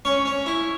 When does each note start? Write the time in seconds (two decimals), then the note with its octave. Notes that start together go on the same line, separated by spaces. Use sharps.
0.05 C#4 C#6
0.25 C#4
0.46 E4